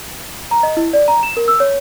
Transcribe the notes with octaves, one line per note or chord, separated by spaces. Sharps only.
A#5
D#5
E4
D5
A#5
E7
A#4
E6
C#5